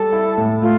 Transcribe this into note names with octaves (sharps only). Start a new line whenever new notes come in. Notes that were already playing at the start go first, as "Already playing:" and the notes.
Already playing: G3 A4
E4
A2
A3 F4